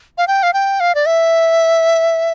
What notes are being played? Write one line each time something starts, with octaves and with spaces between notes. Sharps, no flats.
F5
G5
F5
G5
F5
D5
E5